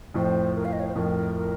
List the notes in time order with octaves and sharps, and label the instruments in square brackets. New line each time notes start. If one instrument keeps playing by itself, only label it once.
[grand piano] F2 A2 [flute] C5
[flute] A#4
F5
D#5
C#5
C5
[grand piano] F2 A2 [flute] A#4
[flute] A#4